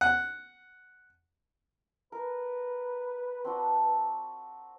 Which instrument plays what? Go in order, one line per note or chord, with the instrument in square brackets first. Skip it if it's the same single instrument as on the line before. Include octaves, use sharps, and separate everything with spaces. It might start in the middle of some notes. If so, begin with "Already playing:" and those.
[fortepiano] F#5
[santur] A#4 [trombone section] B4
[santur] C4 D4 F#4